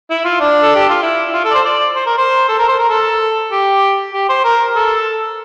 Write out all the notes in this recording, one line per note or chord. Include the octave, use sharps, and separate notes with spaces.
E4
F4
D4
A4
G4
F4
E4
F4
A4
D5
C5
D5
C5
A#4
C5
A4
A#4
C5
A#4
A4
G4
G4
C5
A#4
A4